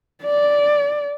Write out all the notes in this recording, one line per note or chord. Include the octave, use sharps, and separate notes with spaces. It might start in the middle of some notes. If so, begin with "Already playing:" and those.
D5